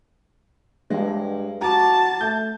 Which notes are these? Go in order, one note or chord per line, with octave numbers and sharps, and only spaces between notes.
G2 G#3
F#4 A5 A#5 D6
A3 G6